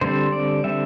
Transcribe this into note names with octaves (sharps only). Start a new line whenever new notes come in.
D3 G3 C4 C5
D5
D3 G3 C4 E5